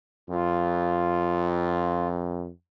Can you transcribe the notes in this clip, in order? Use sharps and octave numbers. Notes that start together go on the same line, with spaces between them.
F2 F4